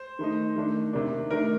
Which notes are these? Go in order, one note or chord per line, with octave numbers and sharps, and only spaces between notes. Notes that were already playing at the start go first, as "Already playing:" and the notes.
Already playing: C5
D#3 A3 D#4
D#3 A3 D4
C3 D#3 A#3 D4
D#3 A3 D4 A#4